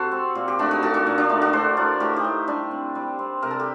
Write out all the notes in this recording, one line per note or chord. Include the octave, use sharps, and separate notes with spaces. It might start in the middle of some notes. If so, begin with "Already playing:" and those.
Already playing: C3 F#4 A4 C5
C4
A#2
G4
A3 D4 F#4
D#4 G4
A#2 F#4 A4
D4 F#4
A#2 D#4
D4
A3 D#4
D4 F#4
A2 A4 C5
A2 A#4 D5
A2 G4 A#4
D#4 G4
A2
G3 D4
C4
G3
C4
C3 A#4
A4
G4